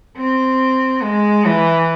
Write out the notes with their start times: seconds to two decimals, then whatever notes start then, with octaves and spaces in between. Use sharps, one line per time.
0.17 C4
1.03 G#3
1.46 E3